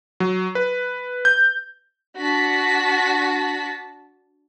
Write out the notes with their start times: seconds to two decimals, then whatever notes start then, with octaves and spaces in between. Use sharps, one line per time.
0.20 F#3
0.55 B4
1.25 G6
2.17 D4 F#4 A5 B6